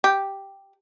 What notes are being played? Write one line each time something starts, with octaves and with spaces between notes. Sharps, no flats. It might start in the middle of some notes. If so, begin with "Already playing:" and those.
G4